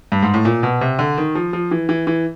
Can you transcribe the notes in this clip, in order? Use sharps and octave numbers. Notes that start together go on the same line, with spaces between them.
G2
G#2
A2
A#2
B2
C3
D3
D#3
F3
F3
E3
E3
E3